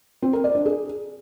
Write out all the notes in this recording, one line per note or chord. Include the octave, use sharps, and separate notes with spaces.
C4
A#4
D5
D4
G#4